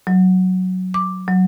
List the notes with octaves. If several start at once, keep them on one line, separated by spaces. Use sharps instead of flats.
F#3
D6
F#3